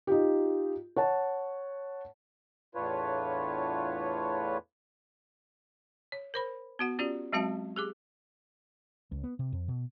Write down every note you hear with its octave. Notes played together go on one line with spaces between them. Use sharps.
D#4 F4 G4
C#5 F#5 A5
E2 A2 D4 F4 B4 C#5
C#5
A#4 C5 B5
B3 F#4 F#5
C#4 F4 G4 D5
F#3 G#3 C4 F#4 E5 A5
G4 G#4 D6
C#2
B3
C3
F2
B2